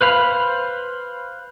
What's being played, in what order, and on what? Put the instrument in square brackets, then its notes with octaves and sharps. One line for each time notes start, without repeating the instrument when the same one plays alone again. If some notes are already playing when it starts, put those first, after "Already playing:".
[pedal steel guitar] B4 C5 F5 B5